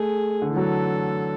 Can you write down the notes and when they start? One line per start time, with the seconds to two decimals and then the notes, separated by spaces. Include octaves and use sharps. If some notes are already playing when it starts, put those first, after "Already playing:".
Already playing: A3 G#4
0.42 D3
0.49 E3
0.56 F#3 A4